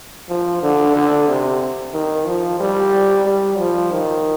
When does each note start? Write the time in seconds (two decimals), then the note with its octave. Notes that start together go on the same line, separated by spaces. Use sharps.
0.29 F3
0.63 D3
0.95 D3
1.28 C3
1.93 D#3
2.26 F3
2.60 G3
3.25 G3
3.58 F3
3.92 D#3